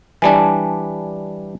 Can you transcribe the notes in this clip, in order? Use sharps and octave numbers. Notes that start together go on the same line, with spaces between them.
E3 G3 D4 G#5 A5